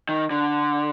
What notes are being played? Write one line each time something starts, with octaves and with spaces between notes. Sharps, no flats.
D#3
D3